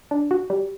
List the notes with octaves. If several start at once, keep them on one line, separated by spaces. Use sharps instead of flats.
D4
F#4
G3